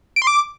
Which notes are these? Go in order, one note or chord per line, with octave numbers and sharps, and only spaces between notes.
D7
C6
D6